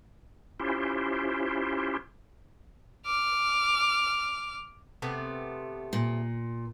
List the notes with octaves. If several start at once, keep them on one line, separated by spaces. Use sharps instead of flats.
C#4 E4 F4 G4 C5
D6 F6
C3 A3 B3
A#2